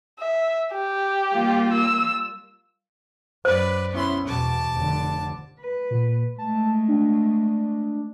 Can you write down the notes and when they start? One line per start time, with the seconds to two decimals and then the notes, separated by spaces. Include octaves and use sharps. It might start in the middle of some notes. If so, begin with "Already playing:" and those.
0.20 E5
0.73 G4
1.33 G3 A#3 F4
1.71 E6
3.45 F#2 B4 C5 D5
3.92 B3 C#4 E4 C6
4.27 E2 B2 A5 D6
4.72 F1 D3
5.60 B4
5.90 A#2
6.38 G#3 A3 A5
6.88 D4